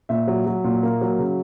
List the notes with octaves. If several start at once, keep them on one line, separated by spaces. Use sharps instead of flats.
A#2 E5
F#3
F#3
A#2
A#3
F#3
C#3